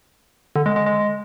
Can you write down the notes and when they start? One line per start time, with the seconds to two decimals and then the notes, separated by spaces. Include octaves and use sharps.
0.56 D3
0.66 G#3
0.76 G#3
0.86 G#3